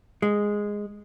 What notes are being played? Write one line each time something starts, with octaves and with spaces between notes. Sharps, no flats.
G#3